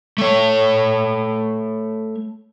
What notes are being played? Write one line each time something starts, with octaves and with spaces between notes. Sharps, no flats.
A3 C#5